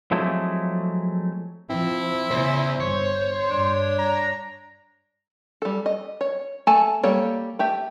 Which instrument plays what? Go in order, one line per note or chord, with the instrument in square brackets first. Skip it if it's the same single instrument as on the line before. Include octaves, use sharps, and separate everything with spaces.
[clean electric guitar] F3 F#3 G#3 A3 C4 E4
[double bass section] F3 [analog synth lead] C4 [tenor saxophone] E4
[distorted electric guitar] E2 [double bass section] C#3 [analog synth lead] C5
[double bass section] G1 [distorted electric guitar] C#5
[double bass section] G2 [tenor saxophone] D4
[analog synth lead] A#5
[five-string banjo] G3 A4
D#5
C#5
A3 A4 G#5 A5
G3 A#3 A4 C#5
A3 G4 E5